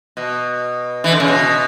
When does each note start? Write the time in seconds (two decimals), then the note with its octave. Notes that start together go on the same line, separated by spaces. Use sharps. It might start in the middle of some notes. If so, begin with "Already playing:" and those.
0.17 B2
1.04 E3
1.12 D3
1.20 C#3
1.28 B2